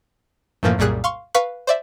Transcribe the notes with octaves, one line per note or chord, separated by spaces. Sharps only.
F#2 A2 E3 F3 A#3
C2 F#2 A#2 G3 G#4 F#6
F5 C6 C#6
B4 F5 B5 C#6 F#6
C5 D5 E5